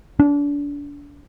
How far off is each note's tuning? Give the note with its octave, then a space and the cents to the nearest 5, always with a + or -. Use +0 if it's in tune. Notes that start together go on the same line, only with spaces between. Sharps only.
D4 -30